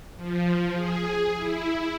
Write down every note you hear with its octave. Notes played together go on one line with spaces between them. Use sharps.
F3
G#4
E4